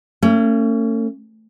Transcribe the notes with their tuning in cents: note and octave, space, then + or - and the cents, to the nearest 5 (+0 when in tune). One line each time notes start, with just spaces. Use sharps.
A3 +45 C#4 +0